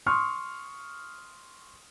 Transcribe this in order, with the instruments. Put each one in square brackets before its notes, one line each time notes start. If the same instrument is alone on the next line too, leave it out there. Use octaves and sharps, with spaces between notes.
[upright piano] C6 C#6 D#6 F6